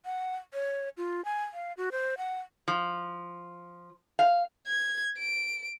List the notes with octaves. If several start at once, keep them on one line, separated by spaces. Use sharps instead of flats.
F#5
C#5
F4
G#5
F5
F#4
C5
F#5
F3
F5
G#6
D7